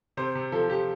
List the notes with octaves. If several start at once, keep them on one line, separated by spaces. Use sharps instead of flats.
C3 C5
C3
F3 A4
F3 G4